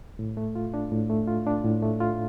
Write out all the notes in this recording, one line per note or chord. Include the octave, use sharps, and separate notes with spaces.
A2
A3
F4
D4
A2
A3
F4
D4
A2
A3
F4